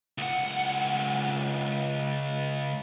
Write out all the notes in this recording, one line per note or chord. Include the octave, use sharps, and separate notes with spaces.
C#2 F#5